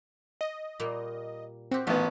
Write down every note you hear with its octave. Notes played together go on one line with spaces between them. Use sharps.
D#5
A#2 G3 A#3
C4 F#4 G4
A1 D#3 F3 B3 C#4